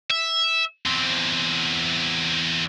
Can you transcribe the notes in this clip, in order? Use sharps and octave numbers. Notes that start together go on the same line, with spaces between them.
E5
E2 C4